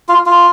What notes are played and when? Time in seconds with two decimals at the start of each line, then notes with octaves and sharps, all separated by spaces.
0.09 F4
0.26 F4